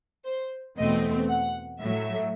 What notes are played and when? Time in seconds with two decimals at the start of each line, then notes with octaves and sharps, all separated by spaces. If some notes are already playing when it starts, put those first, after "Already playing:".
0.25 C5
0.78 E2 B2 A3 C4 D#5
1.29 F#5
1.81 A2 F#3 A3 E5